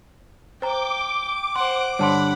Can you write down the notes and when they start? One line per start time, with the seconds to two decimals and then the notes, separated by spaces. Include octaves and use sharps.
0.62 C5 G5 A#5 D6
1.56 C5 F#5 C6
1.99 G2 D3 C#5 F#5 A5 B5 C6